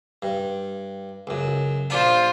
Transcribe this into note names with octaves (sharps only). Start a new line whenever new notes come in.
G2
C#2 F#2
A#1 D4 F4 C5 A5